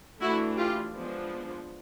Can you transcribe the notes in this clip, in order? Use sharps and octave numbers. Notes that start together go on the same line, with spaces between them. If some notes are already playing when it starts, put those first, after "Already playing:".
E3 A3 D4 E4 F#4
F4 G4
F3 G#3 B3 D4